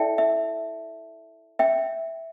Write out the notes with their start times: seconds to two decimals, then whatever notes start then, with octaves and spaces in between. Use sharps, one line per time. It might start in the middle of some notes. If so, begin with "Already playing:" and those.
Already playing: E4 A4 D5 E5 G5 A5
0.18 E5
1.59 E5 G5